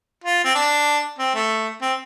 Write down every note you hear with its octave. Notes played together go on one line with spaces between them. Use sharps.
F4
C4
D4
C4
A3
C4